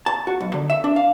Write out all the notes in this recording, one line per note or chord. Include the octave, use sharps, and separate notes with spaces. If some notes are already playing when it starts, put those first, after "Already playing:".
A5
F#4
B1
D3
E5
D4
F5